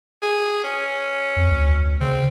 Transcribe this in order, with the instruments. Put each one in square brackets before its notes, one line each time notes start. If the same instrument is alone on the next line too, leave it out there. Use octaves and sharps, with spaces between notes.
[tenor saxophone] G#4
C#4
[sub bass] F2
D2
[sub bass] C#3 [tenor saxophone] C4